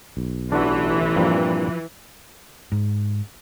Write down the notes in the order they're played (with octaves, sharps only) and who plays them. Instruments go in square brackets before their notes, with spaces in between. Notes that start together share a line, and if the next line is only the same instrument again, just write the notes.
[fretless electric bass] B1
[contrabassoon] A1 [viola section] E3 [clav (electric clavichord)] D4 F#4
[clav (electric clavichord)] G2 A#2 C4 [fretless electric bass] F3
[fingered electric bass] G#2